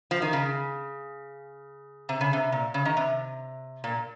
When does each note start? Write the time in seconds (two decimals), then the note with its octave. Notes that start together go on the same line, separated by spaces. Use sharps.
0.11 F3
0.22 D#3
0.33 C#3
2.09 C3
2.21 C#3
2.33 C3
2.52 A#2
2.74 C#3
2.85 D#3
2.97 C3
3.84 A#2